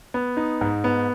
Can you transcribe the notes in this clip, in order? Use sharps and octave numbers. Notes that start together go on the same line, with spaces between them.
B3
D#4
G#2
B3